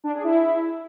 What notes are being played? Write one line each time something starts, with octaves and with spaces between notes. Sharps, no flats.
D4
G#4
E4